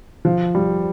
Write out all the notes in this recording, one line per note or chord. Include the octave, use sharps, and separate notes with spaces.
F3
G3